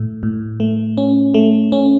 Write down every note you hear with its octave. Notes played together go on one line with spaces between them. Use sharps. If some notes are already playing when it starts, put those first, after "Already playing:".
Already playing: A2 A3
A2
A3
C#4
A3
C#4